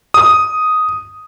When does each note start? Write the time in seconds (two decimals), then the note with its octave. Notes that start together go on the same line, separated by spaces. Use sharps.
0.14 D#6